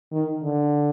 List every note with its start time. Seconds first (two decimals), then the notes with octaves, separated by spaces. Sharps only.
0.12 D#3
0.43 D3